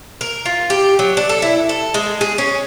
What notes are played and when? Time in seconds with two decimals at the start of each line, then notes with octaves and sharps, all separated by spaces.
0.21 A#4
0.45 F4
0.70 G4
0.99 F#3
1.17 D4
1.29 A4
1.42 E4
1.69 A4
1.94 G#3
2.21 G#4
2.38 C#4